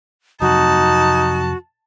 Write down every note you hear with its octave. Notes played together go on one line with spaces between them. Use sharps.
F2 C3 F#3 D#4 F#4 A5